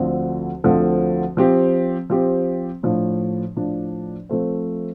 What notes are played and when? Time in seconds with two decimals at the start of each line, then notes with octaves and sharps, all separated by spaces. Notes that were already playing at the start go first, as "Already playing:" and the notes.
Already playing: D2 D3 F3 C4 A4
0.64 D2 D3 F3 C4 A4
1.37 F3 C4 G4
2.10 F3 C4 G4
2.83 A2 F3 D4
3.56 A2 F3 D4
4.29 F3 A3 C4